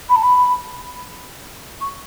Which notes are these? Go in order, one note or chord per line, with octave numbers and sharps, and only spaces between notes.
B5
A5
B5
C#6